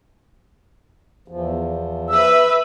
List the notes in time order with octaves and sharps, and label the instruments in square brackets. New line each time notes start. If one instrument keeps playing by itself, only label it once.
[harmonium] E2 F3
[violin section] B4 E5 [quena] E6